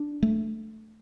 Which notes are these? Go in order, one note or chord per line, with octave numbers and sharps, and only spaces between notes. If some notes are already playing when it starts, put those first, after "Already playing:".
Already playing: D4
A3